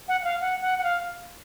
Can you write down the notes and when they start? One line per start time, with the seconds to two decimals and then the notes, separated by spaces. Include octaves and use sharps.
0.08 F#5
0.21 F#5
0.24 F5
0.41 F#5
0.62 F#5
0.79 F#5
0.84 F5